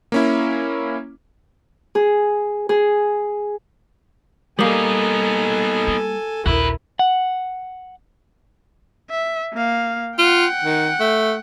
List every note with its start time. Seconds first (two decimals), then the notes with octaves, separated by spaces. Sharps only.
0.12 A#3 C#4 E4
1.95 G#4
2.69 G#4
4.59 G3 A#3 B3 D#4 A4 G#5
5.87 F4
6.46 A#1 D#2 E4 F#4 A#4 B4
6.99 F#5
9.11 E5
9.54 A#3 F5
10.18 F4 F#5 G5
10.63 D#3
11.00 A3